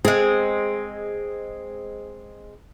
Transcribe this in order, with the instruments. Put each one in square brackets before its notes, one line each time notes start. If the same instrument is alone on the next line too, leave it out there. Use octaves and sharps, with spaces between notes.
[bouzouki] G#3 C4 [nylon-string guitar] G#4